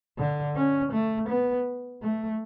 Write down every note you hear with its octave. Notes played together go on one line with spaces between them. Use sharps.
D3
C#4
A3
B3
A3